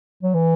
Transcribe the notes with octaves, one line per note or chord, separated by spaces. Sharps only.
F#3
E3